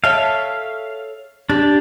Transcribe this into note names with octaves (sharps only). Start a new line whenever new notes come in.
A4 C#5 E5 F5
D4 G4